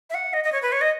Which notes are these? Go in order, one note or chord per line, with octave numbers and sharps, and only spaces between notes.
E5
F#5
D#5
D#5
C#5
B4
C#5
D#5